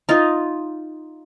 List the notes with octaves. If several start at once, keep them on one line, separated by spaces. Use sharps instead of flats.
D#4 F4